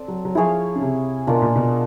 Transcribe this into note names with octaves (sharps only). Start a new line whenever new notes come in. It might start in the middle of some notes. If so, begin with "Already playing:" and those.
Already playing: C4 A4 D5
F#3
F#3
F3 E4 G#4 C#5 F5
C#3
C3
B2 D4 F4 A#4 D5
A#2
B2